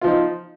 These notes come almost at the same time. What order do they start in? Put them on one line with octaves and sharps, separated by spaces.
F4 F3 D#4